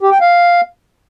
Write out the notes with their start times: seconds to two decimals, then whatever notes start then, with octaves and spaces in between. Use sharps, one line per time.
0.01 G4
0.11 G5
0.21 F5